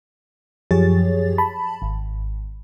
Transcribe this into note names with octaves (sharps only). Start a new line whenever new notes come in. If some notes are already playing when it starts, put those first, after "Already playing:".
F#2 F3 G4 G#4 C#5 A6
A5 B5
G#1